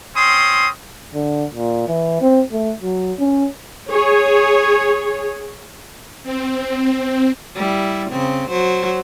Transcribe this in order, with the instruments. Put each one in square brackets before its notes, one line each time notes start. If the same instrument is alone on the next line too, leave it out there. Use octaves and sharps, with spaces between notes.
[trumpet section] C4 C#4 C6 D#6
[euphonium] D3
A#2
E3
C4
A3
F#3
C#4
[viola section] G#4 C#5
[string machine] C4
[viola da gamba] G3 E4
C#3 C4
F#3 C5